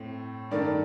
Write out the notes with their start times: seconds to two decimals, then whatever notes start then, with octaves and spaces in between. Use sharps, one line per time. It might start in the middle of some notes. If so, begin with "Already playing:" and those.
Already playing: A2 A3 C4
0.51 G2 D#3 A3 D4 A#4 D5